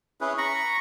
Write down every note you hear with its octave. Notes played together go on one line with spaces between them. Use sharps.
C#4 E4 G#4 B4
A#5 B5 C#6